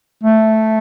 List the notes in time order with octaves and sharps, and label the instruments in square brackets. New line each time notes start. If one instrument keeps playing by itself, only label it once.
[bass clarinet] A3